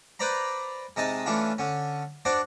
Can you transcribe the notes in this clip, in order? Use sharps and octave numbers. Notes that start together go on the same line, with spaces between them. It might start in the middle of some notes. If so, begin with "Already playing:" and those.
B4 C5 D5 A#5 B5
C3 G#3 D#4 D#5 A5 D#6
E3 A3 C#4 D4 F4
D3 C#4
D4 F#4 C5 D5